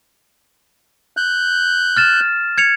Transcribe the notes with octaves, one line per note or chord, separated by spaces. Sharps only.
F#6 G6
F6 A6 E7
G#6 C#7 F7